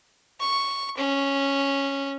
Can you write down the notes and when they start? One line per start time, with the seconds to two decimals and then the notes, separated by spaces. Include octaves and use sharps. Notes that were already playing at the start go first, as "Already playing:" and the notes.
0.40 C#6
0.97 C#4